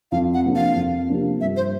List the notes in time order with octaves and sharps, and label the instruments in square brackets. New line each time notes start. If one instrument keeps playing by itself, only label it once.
[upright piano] F2 [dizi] F5
[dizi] F#5
[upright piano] C3 F3 A#3 D4
[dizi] F5
[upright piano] F2
C3 F3 A#3 D4
[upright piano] G2 [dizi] E5
[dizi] C5